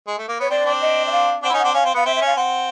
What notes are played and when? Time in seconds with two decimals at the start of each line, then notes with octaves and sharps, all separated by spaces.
0.07 G#3
0.18 A3
0.28 A#3
0.40 B3 C#5
0.50 C4 D5
0.65 C4 D4
0.81 D#5
1.07 E5
1.12 F5
1.43 C4 D4 F#5
1.49 E4
1.53 C#4 D#4
1.59 F#5
1.64 C4 D4
1.74 C#4 F5
1.85 C4
1.95 B3 F5
2.05 C4 E5
2.16 E5
2.21 C#4
2.26 F5
2.36 C4 F#5